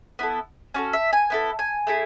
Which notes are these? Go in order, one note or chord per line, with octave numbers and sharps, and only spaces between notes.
B3 E4 A4
C#4 F#4 A4 D5
E5
G#5
B3 E4 A4
G#5
A3 E4 G#4